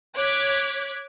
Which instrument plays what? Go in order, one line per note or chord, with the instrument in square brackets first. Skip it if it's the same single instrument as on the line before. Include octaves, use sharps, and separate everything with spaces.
[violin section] C#5 D6 F#6 G#6 B6